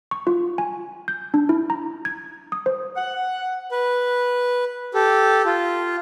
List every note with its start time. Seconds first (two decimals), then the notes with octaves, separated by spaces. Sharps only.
0.11 C#6
0.27 F4
0.58 G#5
1.08 G6
1.34 D4
1.49 E4
1.70 A#5
2.05 G#6
2.52 D#6
2.66 C5
2.96 F#5
3.72 B4
4.94 G4 A4
5.45 F4